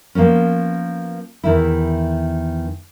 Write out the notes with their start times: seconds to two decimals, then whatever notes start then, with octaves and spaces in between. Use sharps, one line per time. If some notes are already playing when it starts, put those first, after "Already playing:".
0.15 F3 A#3 B3 C#4
1.44 E2 D#3 E4